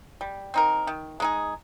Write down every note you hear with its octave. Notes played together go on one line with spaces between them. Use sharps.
G3
C4 D#4 A#4
D#3
G#3 D#4 G#4